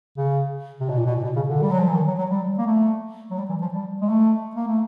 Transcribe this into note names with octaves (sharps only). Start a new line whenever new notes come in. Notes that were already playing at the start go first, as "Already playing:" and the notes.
C#3
C3
B2
A#2
B2
A#2
B2
C#3
D3
G3
F#3
F3
E3
D#3
F#3
F#3
G3
A#3
A3
F#3
G3
E3
F3
G3
G#3
A3
A#3
A3